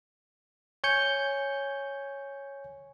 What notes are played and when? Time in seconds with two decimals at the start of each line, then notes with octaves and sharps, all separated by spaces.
0.84 C#5 G#5 G6 C#7